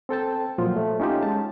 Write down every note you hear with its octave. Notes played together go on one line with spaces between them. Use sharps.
C4 A4 G5 A5
A#2 F3 F#3 F4
A3
C#4 D#4 F4 G4
G#3 A5